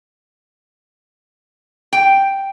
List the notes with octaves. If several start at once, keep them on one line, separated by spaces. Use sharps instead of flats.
G5